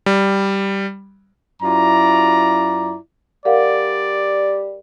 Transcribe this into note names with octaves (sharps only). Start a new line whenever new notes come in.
G3
F#2 E4 F4 D5 A#5
G3 A#4 D5 F5 F#5